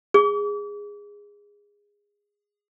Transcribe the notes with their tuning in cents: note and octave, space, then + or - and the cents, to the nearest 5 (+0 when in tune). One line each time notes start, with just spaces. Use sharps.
G#4 -15 D6 -40